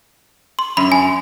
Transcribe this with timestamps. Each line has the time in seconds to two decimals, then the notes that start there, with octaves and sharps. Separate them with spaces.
0.59 C6
0.77 F#2 B5
0.92 G#5